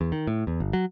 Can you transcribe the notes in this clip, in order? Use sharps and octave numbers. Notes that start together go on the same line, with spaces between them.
E2
D#3
A2
E2
G1
F#3